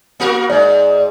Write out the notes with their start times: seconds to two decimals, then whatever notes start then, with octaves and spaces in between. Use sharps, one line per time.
0.20 A#3 F#4 A#4
0.50 G#2 D5